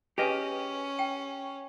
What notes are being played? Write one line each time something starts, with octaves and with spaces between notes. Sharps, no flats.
C#4 G4 G#4 B4 D#5 G#5
G5